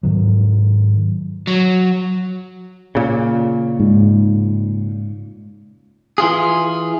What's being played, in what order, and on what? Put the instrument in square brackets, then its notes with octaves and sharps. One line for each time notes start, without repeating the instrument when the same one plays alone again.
[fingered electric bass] G#2 D#3 F#3
[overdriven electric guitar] F#3
[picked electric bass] A#2 C#3
[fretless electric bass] G#2
[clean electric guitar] E3 F4 G#4